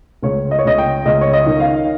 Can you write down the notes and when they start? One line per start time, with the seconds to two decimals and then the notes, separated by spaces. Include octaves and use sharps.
0.22 C#2 C#5
0.51 D#5
0.59 C#5
0.65 C#2 D#5
0.78 G5
1.05 C#2 D#5
1.21 C#5
1.33 D#5
1.46 D#3
1.60 F5